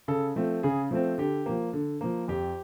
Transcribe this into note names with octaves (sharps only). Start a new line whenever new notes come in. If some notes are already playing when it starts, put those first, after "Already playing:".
C#3 A4
F3 A3 C4
C#3 G#4
F3 A3 C4
D3 G4
F3 A#3
D3
F3 A#3
F2 G4